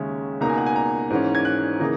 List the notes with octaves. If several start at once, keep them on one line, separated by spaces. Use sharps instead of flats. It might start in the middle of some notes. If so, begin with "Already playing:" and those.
Already playing: D#2 C#3 G#3 C#4 E5
C#2 B2 A#3 D#4 A#5
G#5
F#5
G#5
A#5
G#2 E3 A#3 C#4
G#6
F#6
C#3 E3 A#3 D#4